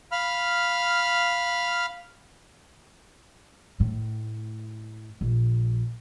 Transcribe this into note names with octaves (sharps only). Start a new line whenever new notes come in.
F5 B5 F6
A2
A#1